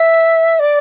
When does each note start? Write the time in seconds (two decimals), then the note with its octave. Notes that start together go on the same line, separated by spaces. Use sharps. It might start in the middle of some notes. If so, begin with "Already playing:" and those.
Already playing: E5
0.59 D5